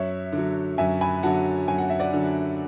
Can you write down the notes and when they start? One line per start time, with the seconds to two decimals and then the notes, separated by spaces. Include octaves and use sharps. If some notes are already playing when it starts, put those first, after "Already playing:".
Already playing: F#2 C#5 E5
0.32 D3
0.38 F#3
0.78 F#2 E5 G#5
1.01 G#5 B5
1.23 D3 F#3 F#5 A5
1.68 F#2 G#5
1.78 F#5
1.90 E5
2.00 D5 F#5
2.13 D3 F#3